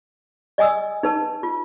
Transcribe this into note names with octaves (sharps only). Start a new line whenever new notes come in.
D5 D#5 G#5 D#6 E6
D#4 B4 A5
F4